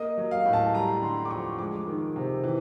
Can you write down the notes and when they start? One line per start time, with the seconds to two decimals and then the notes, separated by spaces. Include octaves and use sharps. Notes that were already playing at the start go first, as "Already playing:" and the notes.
Already playing: A#3 D#5
0.18 F#3
0.31 F5
0.45 A2
0.53 A5
0.74 G3 A#5
1.02 D3 C6
1.25 D6
1.31 F2 C#6
1.59 G#3 D6
1.87 D#3
2.16 C3
2.44 E3